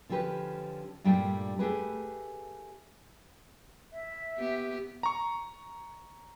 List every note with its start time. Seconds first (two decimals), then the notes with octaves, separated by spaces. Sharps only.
0.09 D3 F3 C#4 G4 B4
1.04 G2 A#2 G3 A3 D4 G5
1.59 A3 G4 G#4 B4
3.93 E5
4.38 B3 G4
5.03 A#5 C#6